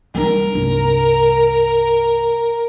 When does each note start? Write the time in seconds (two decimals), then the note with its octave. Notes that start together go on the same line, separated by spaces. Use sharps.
0.15 G3 D#4 A#4
0.54 C2 G2